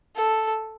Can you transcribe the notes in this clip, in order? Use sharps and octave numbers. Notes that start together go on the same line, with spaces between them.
A4